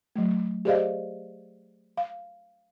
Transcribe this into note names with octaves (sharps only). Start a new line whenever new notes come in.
F#3 A3
G4 G#4 C5 D5 D#5 F5
F5